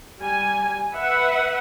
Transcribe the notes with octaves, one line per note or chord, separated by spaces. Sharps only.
G3 G#5
B4 E5 F#5